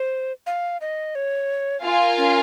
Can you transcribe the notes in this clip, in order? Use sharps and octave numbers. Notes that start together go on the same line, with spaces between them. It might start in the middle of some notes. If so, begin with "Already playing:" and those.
Already playing: C5
F5
D#5
C#5
F4 A#4 F5 G#5
C#4